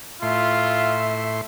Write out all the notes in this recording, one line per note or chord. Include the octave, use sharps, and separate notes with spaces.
A2 F4 E5 C6